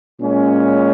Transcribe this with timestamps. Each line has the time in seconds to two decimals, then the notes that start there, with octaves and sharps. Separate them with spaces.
0.18 A#2 G#3 C#4